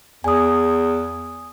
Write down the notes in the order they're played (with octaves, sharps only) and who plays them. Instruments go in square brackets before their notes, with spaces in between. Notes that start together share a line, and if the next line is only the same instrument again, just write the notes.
[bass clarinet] E2 [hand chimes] G#5 D#6